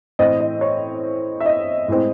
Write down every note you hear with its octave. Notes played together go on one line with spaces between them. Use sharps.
A2 E3 C4 D#5
D#5
C#5
E5
D#5
A2 G#3 C4